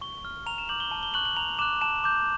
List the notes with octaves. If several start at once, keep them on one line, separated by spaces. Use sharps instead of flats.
C#6 G7
F6
A#5 F7
E7
D6 G6 F#7
G7
A5
G7
C#6 F#6 F#7
F#7
A#5 F7
D6 F#6 E7
A5 E7
D6 G6